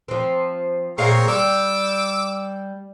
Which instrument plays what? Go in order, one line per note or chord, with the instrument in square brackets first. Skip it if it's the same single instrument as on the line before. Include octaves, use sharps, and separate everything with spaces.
[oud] F3 C4
[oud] A#2 G#4 F5 [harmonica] C4 A#4 C#5
[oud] G3 [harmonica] D6 E6